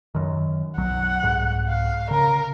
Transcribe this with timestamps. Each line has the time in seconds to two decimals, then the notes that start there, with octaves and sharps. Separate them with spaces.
0.15 F#2 D#3
0.77 B1 F#3 F#5
1.22 C2 G#2
1.69 F5
2.11 C#3 A#4